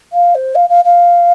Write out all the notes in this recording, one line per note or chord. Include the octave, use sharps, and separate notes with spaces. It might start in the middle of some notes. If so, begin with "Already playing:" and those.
F5
C5
F5
F5
F5